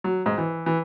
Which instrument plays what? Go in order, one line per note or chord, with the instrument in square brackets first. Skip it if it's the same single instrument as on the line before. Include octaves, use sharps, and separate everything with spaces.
[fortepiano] F#3
G#2
E3
E3